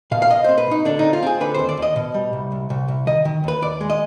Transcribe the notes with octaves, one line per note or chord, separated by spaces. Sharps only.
B2 F5
F5
B2 D#5
C4 C5
B4
B2 D#4
D3 D4
C4 D#4
F4
C4 G#4
D3 B4
D#2 C5
D5
D#2
D#5
B2
G3
C2
C2
C2
C2
D#3 D#5
D#3
D#2 B4
D#2 D5
G#3
D#5